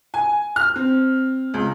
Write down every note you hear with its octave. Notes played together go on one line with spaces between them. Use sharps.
G#5
F6
C4
C#2